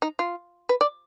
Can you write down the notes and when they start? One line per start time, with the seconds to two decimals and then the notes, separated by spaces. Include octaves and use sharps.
0.02 D#4
0.19 F4
0.69 B4
0.81 D5